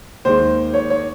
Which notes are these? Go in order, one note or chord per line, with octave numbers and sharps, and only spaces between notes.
D#2 D#3 G#3 C5
C#5
C#5